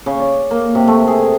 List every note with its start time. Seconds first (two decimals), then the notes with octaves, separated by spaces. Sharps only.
0.06 C#3
0.19 D5
0.51 A#3
0.75 C3
0.88 A3
1.08 G#4